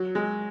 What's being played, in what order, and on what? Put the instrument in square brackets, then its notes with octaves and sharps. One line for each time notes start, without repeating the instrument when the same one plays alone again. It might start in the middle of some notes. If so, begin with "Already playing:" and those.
Already playing: [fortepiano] F#3
G#3